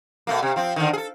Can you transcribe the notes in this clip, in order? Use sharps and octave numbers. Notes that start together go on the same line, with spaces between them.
B2 A3 A#3
C3
F3 C4
D3 D#3
G#4 A4